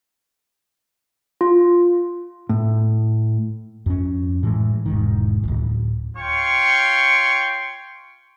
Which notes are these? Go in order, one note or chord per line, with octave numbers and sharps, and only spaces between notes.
F4
A2
F2 C#4
A2 E3 G#3
E1 G#2 D#3
D1 G#1
F4 C#5 G5 C6 C#6